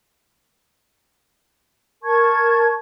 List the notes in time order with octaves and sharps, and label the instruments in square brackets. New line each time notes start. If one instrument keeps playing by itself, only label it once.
[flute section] A#4 A5 C#6 G#6